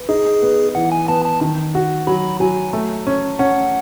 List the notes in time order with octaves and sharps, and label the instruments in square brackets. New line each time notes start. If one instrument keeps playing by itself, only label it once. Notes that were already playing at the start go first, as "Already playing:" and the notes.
Already playing: [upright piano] B4
[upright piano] D#4 [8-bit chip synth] G#4
[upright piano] B3
[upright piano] E3 [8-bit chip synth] F#5
[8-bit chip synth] G#5
[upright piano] B3 [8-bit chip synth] A5
[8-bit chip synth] A5
[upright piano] D#3
F#4
[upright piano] F#3 [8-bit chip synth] B5
[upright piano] F#3 [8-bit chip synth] G#5
[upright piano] A3
C#4
[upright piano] C#4 [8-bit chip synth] F#5